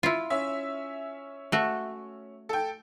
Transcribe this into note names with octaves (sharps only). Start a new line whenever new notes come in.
E4 F4
C#4 E5
A3 F#4
A4 G5